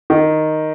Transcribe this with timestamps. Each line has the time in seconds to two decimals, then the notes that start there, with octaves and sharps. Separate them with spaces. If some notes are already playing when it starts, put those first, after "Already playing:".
0.10 D#3